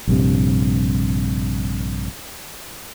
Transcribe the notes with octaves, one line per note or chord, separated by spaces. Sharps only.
A#1 G2 C3